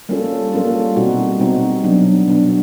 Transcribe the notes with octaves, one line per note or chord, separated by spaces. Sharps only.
G3 A#3 C#4 F4 A4
G3 A#3 C#4 F4 A4
B2 G3 C4 D#4 F#4
B2 G3 C4 D#4 F#4
B2 F#3 B3 D4
B2 F#3 B3 D4